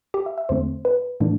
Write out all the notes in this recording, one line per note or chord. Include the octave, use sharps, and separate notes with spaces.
G4
E5
E5
E2 D3 A3 C4 C5
B4
A2 E3 A3 D4